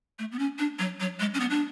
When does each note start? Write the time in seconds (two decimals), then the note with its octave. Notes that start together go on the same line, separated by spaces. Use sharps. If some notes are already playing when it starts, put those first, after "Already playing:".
0.19 A3
0.32 B3
0.39 C#4
0.59 D4
0.79 F#3
1.00 F#3
1.20 G#3
1.34 C#4
1.40 B3
1.50 D4